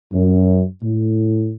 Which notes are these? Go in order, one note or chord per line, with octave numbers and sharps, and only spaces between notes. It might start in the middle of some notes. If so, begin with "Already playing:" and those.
F#2
A2